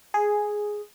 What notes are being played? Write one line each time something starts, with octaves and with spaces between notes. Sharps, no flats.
G#4